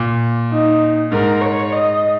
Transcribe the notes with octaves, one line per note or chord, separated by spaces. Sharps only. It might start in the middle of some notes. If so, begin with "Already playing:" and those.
Already playing: A#2
D#4
G#2 A#4
C#5
D#5